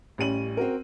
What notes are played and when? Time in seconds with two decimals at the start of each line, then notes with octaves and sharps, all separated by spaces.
0.18 A1 G3 C#4 D#7 F#7
0.57 C4 F#4 A#4